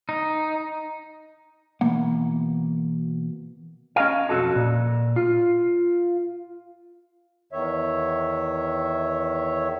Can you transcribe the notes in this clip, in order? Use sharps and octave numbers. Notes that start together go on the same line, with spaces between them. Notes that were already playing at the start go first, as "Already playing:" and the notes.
D#4
B2 E3 A#3 F#5
C#4 D#5 F5
B1 F2 C4 F#4 A4
A#2
F4
E2 D#3 C#5 E5